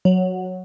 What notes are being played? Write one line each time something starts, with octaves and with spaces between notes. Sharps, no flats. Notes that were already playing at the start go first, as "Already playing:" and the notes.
F#3